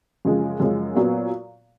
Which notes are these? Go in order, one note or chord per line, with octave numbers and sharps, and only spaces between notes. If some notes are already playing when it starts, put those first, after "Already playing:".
F#2 C#3 F3 G#3
F#2 C#3 F3 G#3
A#2 F#3 B3